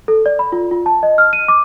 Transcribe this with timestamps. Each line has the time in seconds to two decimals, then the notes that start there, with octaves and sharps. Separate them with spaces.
0.08 A4
0.26 D5
0.39 B5
0.52 F4
0.71 F4
0.86 A5
1.03 D#5
1.18 F6
1.33 D#7
1.48 D6